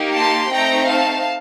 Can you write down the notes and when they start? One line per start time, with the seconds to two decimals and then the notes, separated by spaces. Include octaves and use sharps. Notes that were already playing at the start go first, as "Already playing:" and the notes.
Already playing: A#3 D#4 G4
0.15 A5 C6
0.51 A3 C4 D#4 G5 A#5
0.87 F5 A5